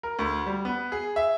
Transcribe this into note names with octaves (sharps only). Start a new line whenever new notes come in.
A#4
D2
G3
B3
G#4
E5